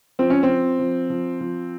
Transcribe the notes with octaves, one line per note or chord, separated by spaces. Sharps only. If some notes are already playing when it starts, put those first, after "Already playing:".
F3 C4
C#4
C4
F3
F3
F3
F3